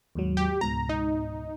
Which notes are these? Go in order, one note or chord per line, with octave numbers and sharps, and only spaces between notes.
D#2 G#2 F#3
G4
C#2 G#2 B2 A#5
D#4